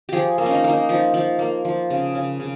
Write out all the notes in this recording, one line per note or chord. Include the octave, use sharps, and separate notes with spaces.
F3 G4 G#4
A#3
C#4
D#4
A#3
D#4
F3 D#4
F3
A#3
F3
C#3
C#3
C#3